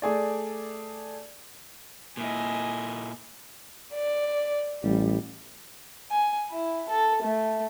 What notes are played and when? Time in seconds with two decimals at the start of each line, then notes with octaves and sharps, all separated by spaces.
0.02 A3 G#4 D5
2.17 A#2 E4 D#5 G#5
3.93 D5
4.83 A1 G3
6.10 G#5
6.51 E4
6.89 A4
7.23 A3